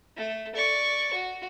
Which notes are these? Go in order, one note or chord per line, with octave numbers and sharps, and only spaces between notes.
A3 A4
D5 C#6
F#4